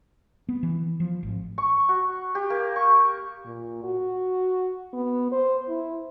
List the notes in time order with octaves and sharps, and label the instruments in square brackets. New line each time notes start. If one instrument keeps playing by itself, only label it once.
[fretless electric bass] B3
E3
F3
G#1
[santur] C#6
F#4
G4
A#3
C#6
[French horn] A#2
F#4
B3
C5
E4